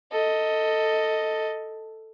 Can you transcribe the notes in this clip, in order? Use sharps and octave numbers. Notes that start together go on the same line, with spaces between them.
A4 D#5